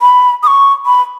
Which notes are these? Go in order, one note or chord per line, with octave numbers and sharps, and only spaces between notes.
B5
D#6
C#6
B5